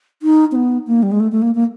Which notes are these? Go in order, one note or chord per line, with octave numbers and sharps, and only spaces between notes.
D#4
C4
B3
A#3
G3
G#3
A3
A3
A#3
A#3